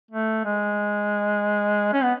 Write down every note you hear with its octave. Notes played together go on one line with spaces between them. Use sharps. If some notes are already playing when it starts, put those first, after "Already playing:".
A3
G#3
C#4
B3